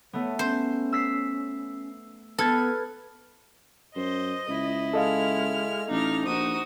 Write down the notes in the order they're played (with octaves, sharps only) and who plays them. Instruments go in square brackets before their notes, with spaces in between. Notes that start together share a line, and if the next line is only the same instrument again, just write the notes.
[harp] A3 B3 [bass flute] C#5
[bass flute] C#4 [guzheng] C5
[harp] E6 B6 C7
[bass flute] B3 [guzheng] A4 [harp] B4 F6 G#6
[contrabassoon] F#2 [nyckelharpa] C5 [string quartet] D#5
[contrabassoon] C#2 [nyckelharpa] E4
[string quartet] G#3 F6 [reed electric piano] A4 D#5 F5
[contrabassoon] A1 [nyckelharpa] D4 [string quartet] D#4 F6
[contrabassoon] A#1 [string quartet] D#4 F#4 C5 [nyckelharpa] D#6